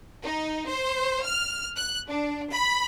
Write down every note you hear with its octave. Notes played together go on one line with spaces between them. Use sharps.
D#4
C5
F6
F#6
D4
B5